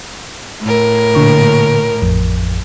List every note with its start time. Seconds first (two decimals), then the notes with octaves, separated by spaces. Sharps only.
0.61 A2 A#4
1.15 A#2 D3 C#6
2.02 A1 F2